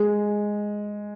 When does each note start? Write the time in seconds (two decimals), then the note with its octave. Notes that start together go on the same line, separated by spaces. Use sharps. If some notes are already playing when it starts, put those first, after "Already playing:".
Already playing: G#3